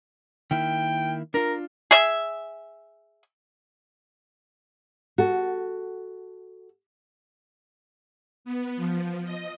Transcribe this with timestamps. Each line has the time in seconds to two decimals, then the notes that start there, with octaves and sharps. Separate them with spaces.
0.51 D#3 A#3 E4 G5
1.34 D4 F4 A#4
1.91 G#4 E5
5.18 F#4 A4
8.45 B3
8.76 F3
9.25 D#5